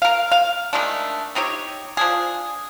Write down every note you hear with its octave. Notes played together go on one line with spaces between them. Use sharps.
A#4 F5
F5
D#3 G#3 A3 D4
C4 D#4 G4 C#5
F3 D4 G#4